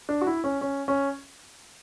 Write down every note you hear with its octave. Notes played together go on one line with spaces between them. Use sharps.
D4
F#4
E4
C#4
C#4
C#4